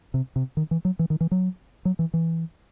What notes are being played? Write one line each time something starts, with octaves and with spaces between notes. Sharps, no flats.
C3
C3
D#3
E3
F#3
E3
D#3
E3
F#3
F#3
E3
E3